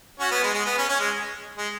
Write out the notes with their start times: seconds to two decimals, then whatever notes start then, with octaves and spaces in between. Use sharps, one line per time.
0.20 C#4 F#4
0.31 B3
0.44 G#3
0.54 G#3
0.66 B3
0.78 C#4
0.89 C#4
1.00 G#3
1.58 G#3